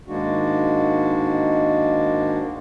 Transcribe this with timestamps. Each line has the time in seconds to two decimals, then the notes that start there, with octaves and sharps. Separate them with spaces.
0.08 G#2 D#3 G#3 A#3 D4 F#4